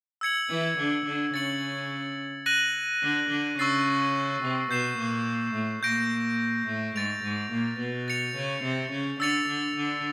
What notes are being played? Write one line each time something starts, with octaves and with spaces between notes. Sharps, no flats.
E6 G#6 C#7 F#7
E3 E4
D3 D4
D3 D4
C#3 C#4 A6 C#7 F#7
F#6 A#6 D#7 F#7
D3 D4
D3 D4
C#3 C#4 C#6 E6 A6 C7
C3 C4
B2 B3 G6 C7 E7
A#2 A#3
A2 A3
A#2 A#3 G6 A#6 D7
A2 A3
G#2 G#3 A6 D7 F7
G#2 G#3
A#2 A#3
B2 B3
A6 C#7 F7
C#3 C#4
C3 C4
C#3 C#4
D3 D4 E6 A6 C#7 F7
D3 D4
D3 D4